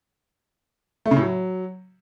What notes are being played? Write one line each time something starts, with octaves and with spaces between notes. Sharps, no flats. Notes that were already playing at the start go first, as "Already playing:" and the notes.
A3
C#3
A2
F#3